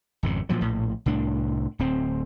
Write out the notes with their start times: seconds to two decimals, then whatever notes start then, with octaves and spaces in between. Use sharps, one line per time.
0.23 G#1 F2 C#3
0.49 A#2 F3 F#3
0.61 A#1 A2
1.06 C2 A2 D4
1.79 D1 C4